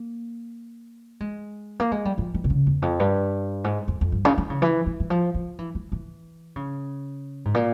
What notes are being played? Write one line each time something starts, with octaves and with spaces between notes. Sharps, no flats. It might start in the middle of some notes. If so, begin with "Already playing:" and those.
Already playing: A#3
G#3
A#3
G#3
G3
F3
E3
C3
C#3
E2
F2
G2
G#2
F2
F2
G2
C#3
E3
C#3
E3
E3
E3
F3
F3
E3
E3
E3
C#3
G#2
A#2